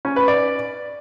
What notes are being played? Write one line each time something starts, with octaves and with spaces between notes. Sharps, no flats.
C#4
B4
D5